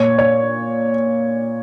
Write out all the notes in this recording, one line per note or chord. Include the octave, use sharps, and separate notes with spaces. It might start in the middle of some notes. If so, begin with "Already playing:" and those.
Already playing: A#2 C#5
C#5